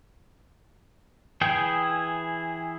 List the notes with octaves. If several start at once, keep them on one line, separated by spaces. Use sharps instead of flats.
E3 E4 G#4 G5 G6